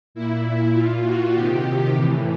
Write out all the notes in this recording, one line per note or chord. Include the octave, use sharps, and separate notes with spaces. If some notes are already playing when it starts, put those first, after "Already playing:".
A#2 E4
A#2 F4
F#4
C3 D#3 G4
A2 E3